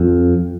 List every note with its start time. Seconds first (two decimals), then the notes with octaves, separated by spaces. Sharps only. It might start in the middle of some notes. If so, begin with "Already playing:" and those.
Already playing: F2